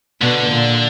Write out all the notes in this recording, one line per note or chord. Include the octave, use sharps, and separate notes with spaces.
B2 D3
A#2